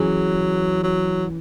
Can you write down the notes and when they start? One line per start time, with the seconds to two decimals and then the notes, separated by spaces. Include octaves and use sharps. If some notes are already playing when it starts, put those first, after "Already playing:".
Already playing: E3 F#3 C#4 G#4
0.84 F#3